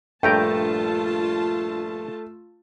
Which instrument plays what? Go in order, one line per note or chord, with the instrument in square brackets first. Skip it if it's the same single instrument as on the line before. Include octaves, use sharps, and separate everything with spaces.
[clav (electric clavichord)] A#1 G2 A#5 [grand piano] A3 [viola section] F4 A5 [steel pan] G5